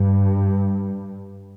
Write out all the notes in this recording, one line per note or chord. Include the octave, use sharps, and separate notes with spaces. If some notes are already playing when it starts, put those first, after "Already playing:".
Already playing: G2